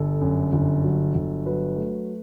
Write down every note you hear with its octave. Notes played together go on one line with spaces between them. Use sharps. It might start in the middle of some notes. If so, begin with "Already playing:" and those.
Already playing: G1 A4
F#2
G1
F#3
G1
F#3 B4
A3